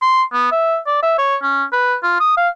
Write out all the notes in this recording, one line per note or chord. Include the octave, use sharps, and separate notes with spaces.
C6
B3
E5
D5
E5
C#5
C#4
B4
F4
D#6
F5